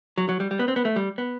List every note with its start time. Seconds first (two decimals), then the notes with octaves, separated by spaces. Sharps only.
0.18 F#3
0.29 F#3
0.40 G3
0.51 G3
0.59 B3
0.68 C4
0.76 B3
0.85 A3
0.96 G3
1.18 B3